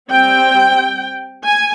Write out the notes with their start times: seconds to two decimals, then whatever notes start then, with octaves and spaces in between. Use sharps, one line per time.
0.10 G3 C4 G5
1.45 G#5